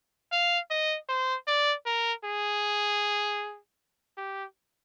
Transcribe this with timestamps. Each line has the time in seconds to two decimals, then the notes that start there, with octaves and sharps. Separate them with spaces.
0.32 F5
0.70 D#5
1.09 C5
1.47 D5
1.86 A#4
2.24 G#4
4.17 G4